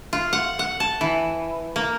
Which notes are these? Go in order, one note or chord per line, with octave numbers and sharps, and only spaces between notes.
F4
F#5
F#5
A5
E3
A#3